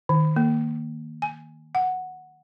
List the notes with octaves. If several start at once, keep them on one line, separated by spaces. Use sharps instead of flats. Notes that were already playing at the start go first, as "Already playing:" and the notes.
D#3
A#3
G#5
F#5